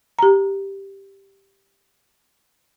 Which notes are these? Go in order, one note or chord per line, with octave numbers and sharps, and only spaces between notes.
G4 A#5